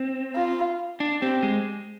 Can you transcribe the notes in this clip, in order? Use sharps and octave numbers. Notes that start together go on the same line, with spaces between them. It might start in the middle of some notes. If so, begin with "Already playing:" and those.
Already playing: C4
F4
D4
C4 G4
G#3